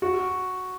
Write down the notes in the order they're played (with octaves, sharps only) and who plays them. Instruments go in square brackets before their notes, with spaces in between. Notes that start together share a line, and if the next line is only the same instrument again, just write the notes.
[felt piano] F#4